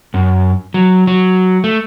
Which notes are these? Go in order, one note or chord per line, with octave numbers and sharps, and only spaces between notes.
F#2
F#3
F#3
A3